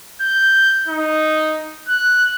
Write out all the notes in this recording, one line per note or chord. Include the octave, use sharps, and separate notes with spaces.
G6
D#4
F#6